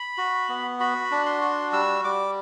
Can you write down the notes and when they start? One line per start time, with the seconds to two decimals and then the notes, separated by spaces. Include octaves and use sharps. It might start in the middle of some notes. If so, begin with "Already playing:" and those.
Already playing: B5
0.18 F#4
0.49 B3
0.80 F#4 B5
1.11 D4
1.26 C6
1.41 F#4
1.72 G3 E6
2.04 G3 D6